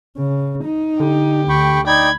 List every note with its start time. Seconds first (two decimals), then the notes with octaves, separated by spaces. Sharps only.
0.17 C#3
0.65 D#4
1.00 D3 G4
1.49 D2 G5 B5 C#6
1.87 D#4 D5 G5 B5 G#6